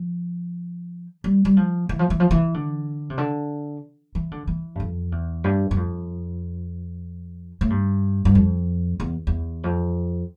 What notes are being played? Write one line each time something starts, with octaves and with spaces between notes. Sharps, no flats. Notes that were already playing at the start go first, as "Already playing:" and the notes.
Already playing: F3
G3
G3
F3
E3
F3
E3
F3
E3
D3
C3
D3
E3
D3
E3
G2
F2
E2
G2
G2
F2
A2
G2
G2
F2
E2
E2
F2